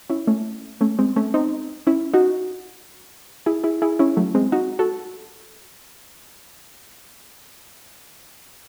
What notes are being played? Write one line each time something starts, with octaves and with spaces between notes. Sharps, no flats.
C#4 E4
A3 C#4
A3 C#4
G#3 C4
A3 C#4
C4 D#4
C#4 E4
D#4 F#4
E4 G#4
E4 G#4
E4 G#4
C#4 E4
F#3 A3
G#3 C4
D#4 F#4
F#4 A4